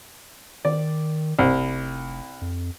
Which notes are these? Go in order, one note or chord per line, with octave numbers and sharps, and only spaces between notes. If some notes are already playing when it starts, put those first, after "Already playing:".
D#3 D5
F1 C2
F2